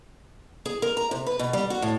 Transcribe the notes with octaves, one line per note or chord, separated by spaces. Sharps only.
G#4
A#4
A#5
C3
B4
B2
G3
F#4
A2